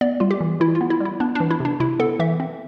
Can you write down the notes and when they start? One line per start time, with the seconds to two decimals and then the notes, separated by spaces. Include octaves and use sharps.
0.01 B3 D5
0.20 G3 F4
0.31 G4
0.41 E3
0.60 E3 E4
0.75 F4
0.81 B3
0.90 E4
1.00 G3 E4
1.20 B3 D4
1.35 E3 D4
1.51 E4
1.60 C3 D4
1.80 C3 E4
1.99 B3 A4
2.19 E3 E5
2.40 C4